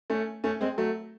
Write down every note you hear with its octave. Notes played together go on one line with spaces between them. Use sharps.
A3 C#4
A3 C#4
G#3 C4
F#3 A3